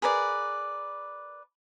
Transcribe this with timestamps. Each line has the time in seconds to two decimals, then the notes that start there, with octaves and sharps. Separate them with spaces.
0.02 G#4 A#4 B4 D5